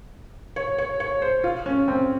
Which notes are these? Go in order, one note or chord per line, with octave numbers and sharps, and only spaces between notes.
C#5
C#5
C#5
C5
F4
C#4
C4